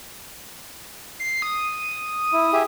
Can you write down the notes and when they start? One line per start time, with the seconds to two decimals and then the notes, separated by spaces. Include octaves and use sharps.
1.20 C7
1.42 D#6
2.33 E4
2.53 G4 G#4 E5